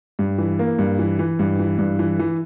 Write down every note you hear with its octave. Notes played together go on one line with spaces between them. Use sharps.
G2
E3
A#3
G2
E3
E3
G2
E3
G2
E3
E3